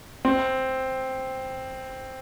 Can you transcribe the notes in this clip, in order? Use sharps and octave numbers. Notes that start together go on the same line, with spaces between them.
C4